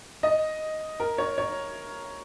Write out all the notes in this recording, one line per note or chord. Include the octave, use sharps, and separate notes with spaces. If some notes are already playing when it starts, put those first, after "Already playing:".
D#5
A#4
C#5
C#5